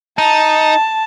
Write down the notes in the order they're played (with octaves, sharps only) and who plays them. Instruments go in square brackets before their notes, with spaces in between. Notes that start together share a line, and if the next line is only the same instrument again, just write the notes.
[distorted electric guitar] D#4 [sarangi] A5